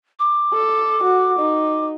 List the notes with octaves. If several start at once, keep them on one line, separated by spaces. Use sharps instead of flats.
D6
A4
F#4
D#4